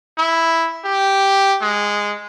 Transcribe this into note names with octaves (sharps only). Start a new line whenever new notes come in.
E4
G4
G#3